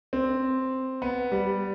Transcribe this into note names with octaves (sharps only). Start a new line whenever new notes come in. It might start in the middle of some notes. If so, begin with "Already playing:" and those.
C4
B3
G3